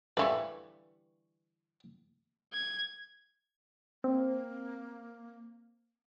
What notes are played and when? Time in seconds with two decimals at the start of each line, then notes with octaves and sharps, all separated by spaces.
0.17 D3 E3 G3 B4 F5 C#6
2.53 G#6
4.04 A#3 C4